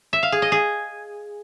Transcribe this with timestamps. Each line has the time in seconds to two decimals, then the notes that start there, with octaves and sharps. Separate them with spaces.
0.13 E5
0.23 F5
0.32 G#4
0.42 D#5
0.52 G#4